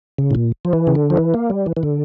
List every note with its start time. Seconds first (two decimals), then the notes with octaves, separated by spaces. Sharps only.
0.18 C#3
0.31 A2
0.35 A#2
0.65 F3
0.73 E3
0.87 C#3
0.95 D3
1.10 F3
1.17 E3
1.34 A#3
1.50 G3
1.66 E3
1.77 E3
1.83 D3